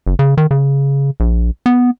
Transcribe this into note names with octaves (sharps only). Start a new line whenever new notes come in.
F#1
C#3
D#3
C#3
A#1
B3